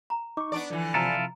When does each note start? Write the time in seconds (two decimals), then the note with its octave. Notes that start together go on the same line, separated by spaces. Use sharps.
0.10 A#5
0.37 D#4 C#6 D6
0.52 B3 D4 D5
0.70 D3 E3 F3
0.94 C3 F3 E4 F4 A4 A#5